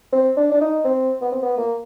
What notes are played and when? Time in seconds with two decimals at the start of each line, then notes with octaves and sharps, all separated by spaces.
0.12 C4
0.37 D4
0.51 D4
0.61 D#4
0.84 C4
1.21 B3
1.32 C4
1.42 B3
1.57 A#3